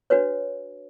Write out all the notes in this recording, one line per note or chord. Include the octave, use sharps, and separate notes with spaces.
D4 F#4 B4 C#5